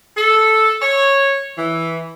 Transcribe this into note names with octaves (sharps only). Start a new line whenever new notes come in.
A4
C#5
E3